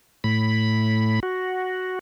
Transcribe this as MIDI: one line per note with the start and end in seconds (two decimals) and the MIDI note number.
0.24 1.20 45
0.24 1.20 83
1.23 1.99 66